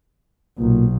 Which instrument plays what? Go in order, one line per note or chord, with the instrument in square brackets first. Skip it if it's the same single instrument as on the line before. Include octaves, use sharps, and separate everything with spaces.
[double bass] B1 [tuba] A#2